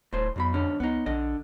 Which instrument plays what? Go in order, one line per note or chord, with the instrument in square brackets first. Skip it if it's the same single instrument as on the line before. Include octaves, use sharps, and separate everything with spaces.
[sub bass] D#1 [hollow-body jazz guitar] A2 C5
[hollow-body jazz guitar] B1 B2 B5 [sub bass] F2
[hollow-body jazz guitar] G#2 D3 C#4
[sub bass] C#2 [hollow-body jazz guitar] B3 D#4
[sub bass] A#1 [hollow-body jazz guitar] D3 D#5